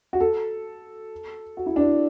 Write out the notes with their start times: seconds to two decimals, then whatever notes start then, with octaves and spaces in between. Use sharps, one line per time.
0.13 F#4
0.20 A4
1.57 F#4
1.66 E4
1.76 D4
1.85 E4